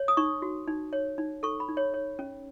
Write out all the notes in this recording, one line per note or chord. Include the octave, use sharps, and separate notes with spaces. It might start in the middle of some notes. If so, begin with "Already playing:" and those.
Already playing: C#5
D#6
D#4 C#6
F#4
D#4
C#5
D#4
A4 C#6
B5
D#4
C#5
C#5
C#4